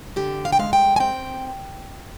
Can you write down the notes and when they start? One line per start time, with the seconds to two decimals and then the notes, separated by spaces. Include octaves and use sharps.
0.16 D3 G4
0.45 F5
0.53 G5
0.59 G#3 F5
0.73 G5
0.96 G#5
1.00 C4 G5